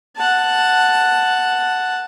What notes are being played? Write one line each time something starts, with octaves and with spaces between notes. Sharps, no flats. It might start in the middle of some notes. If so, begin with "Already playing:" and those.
F#5 A5